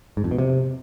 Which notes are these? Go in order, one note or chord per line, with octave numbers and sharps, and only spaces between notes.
G#2
F2
B2
C3